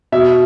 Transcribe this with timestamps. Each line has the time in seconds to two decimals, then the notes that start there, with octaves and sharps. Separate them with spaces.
0.12 B2 E5